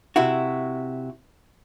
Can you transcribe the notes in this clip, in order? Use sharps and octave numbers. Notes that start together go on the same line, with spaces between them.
C3 E4 F#4